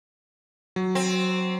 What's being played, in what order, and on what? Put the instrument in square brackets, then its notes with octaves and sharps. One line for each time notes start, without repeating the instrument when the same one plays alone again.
[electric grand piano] F#3
[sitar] C4